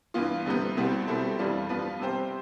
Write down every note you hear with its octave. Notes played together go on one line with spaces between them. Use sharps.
G2 E3 B3 F4
D2 C3 G3 B3
C2 B2 G3 C4
B2 G3 C4 E4 A4
F2 E3 G3 D4 F4
G2 F3 B3 F4 B4
C3 G3 C4 G4 C5